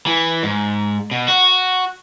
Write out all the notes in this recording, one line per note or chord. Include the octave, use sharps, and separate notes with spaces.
E3
G#2
B2
F#4